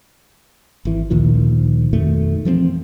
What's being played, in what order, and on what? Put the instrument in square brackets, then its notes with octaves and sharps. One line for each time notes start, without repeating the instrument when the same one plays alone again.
[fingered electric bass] G#1 E3
D2 A#2 D#3 F3
F2 B2 D#3 A3
E3 F3 G#3 C4